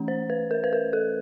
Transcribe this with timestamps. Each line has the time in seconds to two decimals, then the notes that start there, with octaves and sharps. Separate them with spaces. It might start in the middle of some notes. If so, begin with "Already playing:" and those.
Already playing: E3 A3 C#4
0.08 C5
0.30 B4
0.51 A#4
0.64 B4
0.73 A#4
0.93 A4